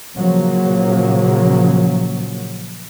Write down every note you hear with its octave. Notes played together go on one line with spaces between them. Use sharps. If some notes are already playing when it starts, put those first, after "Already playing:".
A#2 C#3 F3 F#3 A#3